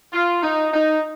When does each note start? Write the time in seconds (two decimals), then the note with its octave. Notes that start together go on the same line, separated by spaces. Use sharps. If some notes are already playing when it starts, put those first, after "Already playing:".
0.13 F4
0.43 D#4
0.74 D#4